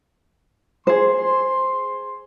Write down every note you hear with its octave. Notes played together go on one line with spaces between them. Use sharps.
G#4 C5 C6